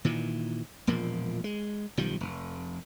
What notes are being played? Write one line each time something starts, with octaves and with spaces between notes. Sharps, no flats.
A#2 D#3 E3
E1 A#2 F3 A#3
G#3
B1 D#3 F3 G3
F1